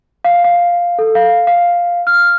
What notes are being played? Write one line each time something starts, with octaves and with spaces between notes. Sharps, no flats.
F5
F5
A4
F5
F5
F6